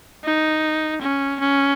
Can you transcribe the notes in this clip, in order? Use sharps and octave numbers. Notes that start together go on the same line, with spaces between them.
D#4
C#4
C#4